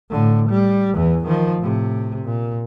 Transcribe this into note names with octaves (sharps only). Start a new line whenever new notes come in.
A2 D3
G3
E2 E3
D#3 F3
A2 C3
A#2